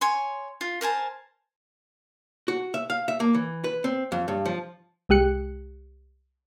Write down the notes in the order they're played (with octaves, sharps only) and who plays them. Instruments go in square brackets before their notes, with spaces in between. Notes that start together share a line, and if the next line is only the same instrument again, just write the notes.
[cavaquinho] C#5 G#5 C6
F4
A#4 C5 G#5 A5
[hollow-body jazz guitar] F#4
E5
F5
E5
A#3
E3
B4
C4
F2
G2
F3
[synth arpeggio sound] C2 G#3 G4 F#6 C#7